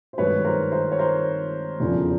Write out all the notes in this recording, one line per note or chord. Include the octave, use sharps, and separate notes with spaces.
C5
G#1 G2 D#3 F#3 A3 B4 C#5
A#4 C5
A#4 C5
C#5
A#4 C5
F1 E2 C#3 F3